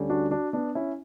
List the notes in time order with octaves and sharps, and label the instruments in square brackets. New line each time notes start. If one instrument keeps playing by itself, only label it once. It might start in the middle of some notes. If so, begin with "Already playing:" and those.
Already playing: [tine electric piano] D2 D3 G3 C#4
[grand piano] D4 F#4
D4 F#4
B3 D4
C#4 E4